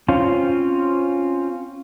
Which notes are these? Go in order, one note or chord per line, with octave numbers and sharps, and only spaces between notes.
C4 C#4 F4